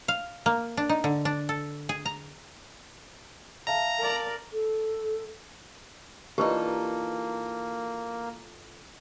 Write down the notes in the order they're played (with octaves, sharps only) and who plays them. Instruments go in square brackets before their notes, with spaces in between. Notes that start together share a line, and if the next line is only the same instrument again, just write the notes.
[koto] F5
A#3
D4
D#4
D3
D4
A4
G#4
A#5
[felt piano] E5 F5 A5 [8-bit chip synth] A#5
[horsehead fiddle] A#4 D5
[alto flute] A4
[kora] E3 D4 D#4 [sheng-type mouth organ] A#3 [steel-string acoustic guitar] F4 A4 [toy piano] G4 B4